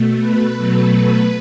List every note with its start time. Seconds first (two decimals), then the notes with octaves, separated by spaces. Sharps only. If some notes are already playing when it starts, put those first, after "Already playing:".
Already playing: B2 A3
0.20 B4
0.57 B2 F#3 A3
0.94 B4